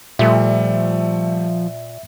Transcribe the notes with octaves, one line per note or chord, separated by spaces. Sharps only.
A#2 F3 G3 A3 E5